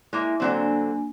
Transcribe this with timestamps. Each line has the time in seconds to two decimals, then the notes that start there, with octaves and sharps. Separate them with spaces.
0.13 G#3 A#3 E4 E5
0.40 D3 F#3 A#3 C4 D4 G#5